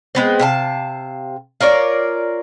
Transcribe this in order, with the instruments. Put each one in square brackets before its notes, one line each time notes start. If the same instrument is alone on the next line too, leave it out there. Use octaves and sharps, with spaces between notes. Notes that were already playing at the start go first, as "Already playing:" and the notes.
[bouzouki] G#3 B3 C4
C3 F5 A5
F4 A#4 C#5 D5